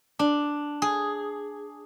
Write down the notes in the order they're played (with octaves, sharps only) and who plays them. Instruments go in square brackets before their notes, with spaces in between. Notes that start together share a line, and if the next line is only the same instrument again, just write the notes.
[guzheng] D4
G#4